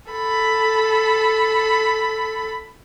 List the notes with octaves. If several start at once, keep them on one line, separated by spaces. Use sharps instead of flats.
A4 B5